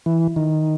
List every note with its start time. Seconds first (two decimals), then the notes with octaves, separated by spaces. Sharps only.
0.06 E3
0.36 D#3